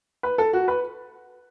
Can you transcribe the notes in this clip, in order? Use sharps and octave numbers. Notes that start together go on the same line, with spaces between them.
B4
A4
F#4
B4